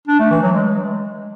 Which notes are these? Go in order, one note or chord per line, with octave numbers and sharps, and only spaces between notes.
D4
A3
E3
F#3
G#3